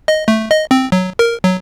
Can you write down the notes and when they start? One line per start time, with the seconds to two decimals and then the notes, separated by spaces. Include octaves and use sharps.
0.08 D#5
0.28 A3
0.51 D#5
0.71 C4
0.92 F#3
1.19 A#4
1.44 F#3